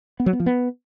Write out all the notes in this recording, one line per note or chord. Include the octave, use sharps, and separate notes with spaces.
B3
F#3
B3
F3
B3